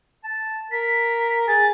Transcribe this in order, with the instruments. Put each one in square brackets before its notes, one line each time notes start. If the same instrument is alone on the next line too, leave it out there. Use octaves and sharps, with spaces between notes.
[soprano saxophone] A5
[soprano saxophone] A#4 [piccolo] B6
[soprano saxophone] G#4 [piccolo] A6